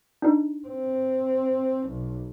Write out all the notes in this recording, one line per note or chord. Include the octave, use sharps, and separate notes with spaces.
D4 D#4
C4
B1